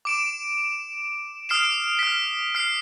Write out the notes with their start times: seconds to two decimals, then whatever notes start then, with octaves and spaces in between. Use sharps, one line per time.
0.05 D6 D7 E7
1.49 D#6 F6 C7 D7 E7
1.99 F6 B6
2.55 F6 C7